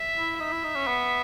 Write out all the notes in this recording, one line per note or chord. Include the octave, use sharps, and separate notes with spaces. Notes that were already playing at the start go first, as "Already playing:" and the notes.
Already playing: E5
E4
D#4 E5
E4
D#4
C#4
B3